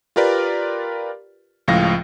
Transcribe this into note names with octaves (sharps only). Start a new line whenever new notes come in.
F4 G4 A#4 B4 D5
C#2 A2 F3 F5 A#6